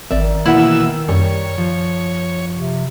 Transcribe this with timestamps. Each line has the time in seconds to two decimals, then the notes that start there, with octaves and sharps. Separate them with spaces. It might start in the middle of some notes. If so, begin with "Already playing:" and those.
0.11 G#1 D#3 D5 E5
0.46 B2 E3 A#3 E4 E5 F#5 E6
1.08 F#2 G3 C#5
1.58 F3
2.57 C3